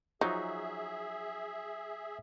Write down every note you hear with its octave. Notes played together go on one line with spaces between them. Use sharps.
F3 F#3 D#4 G#4 E5